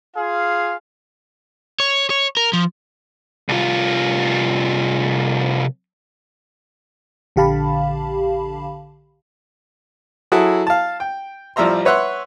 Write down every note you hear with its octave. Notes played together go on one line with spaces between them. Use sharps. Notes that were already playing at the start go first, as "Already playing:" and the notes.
F4 G#4 F5
C#5
C#5
A#4
F3
C2 F4
A#1 D3 G4 F5 A5 B5
F#3 E4 F#4 G#4 A4
F5 A5
G5
A1 F3 G3 E5 A#5 C6
B4 C#5 E5 F#5 C6